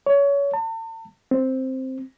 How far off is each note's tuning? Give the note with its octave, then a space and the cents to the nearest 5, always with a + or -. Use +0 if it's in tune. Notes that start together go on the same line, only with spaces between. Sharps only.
C#5 +25
A5 +40
C4 +0